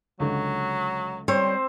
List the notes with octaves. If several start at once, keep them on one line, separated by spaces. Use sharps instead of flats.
C#2 D3 F#3
G3 C4 C5 C#5